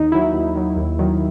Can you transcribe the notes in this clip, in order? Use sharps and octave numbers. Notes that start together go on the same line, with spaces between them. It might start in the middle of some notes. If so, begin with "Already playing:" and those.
Already playing: D#2 D#4
D#3 F#3 E4
D#2
D#3 F#3
D#2
D#3 F#3